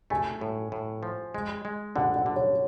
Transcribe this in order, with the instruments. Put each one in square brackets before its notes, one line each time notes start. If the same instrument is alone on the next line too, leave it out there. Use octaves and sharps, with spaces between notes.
[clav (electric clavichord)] A3 [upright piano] G#5
[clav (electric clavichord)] A2
A2
F3
G#3
G#3
[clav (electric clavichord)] D3 [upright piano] F#5
[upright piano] F#5
[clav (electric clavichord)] D3
[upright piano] C#5